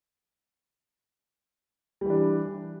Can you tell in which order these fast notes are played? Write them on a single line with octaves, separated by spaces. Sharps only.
G3 E3 D4